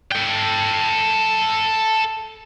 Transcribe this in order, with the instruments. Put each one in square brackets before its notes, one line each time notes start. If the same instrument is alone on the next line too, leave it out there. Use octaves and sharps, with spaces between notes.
[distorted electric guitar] A4 G5